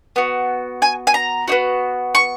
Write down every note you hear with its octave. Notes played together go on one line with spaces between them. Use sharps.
B3 F#4
G#5
G#5
A#5
B3 D#4 F#4
C#6